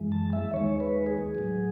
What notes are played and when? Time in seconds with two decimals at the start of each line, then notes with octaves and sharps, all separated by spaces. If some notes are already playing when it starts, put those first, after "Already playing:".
Already playing: F#2 E3 G#3
0.12 A5
0.33 E5
0.53 D#2 D#3 G#3 C#5
0.80 B4
1.06 G#4
1.35 A2 F#3